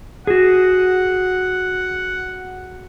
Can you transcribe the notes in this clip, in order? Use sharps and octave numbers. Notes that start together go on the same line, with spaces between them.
F#4 G#4 F#5